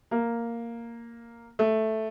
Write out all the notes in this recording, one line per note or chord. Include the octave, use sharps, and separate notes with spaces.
A#3
A3